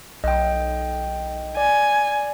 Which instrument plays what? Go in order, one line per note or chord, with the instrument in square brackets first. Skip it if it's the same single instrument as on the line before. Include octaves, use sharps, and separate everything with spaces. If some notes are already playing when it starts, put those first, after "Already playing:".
[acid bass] B1 [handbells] D#5 G5
[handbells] D5 [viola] G#5